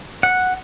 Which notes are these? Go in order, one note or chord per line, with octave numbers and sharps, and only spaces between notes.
F#5